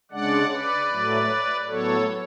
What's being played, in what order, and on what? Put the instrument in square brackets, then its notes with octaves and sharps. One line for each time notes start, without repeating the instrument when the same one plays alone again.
[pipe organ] C#3 G#3 D4 D5 F#5
B4 D5
A2 F#3 A3
A2 F#3 B3 A4 C#5